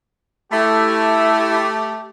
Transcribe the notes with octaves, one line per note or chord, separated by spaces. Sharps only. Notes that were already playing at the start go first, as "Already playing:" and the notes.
A3 E4 G4 E5